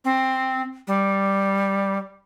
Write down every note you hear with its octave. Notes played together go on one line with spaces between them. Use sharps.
C4
G3